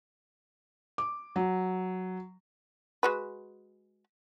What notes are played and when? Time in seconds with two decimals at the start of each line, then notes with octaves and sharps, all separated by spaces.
0.98 D6
1.36 F#3
3.03 G#3 F#4 B4